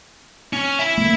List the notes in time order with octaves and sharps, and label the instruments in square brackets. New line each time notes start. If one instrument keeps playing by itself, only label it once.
[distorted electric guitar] C#4
E5 B5
[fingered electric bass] A3 A#3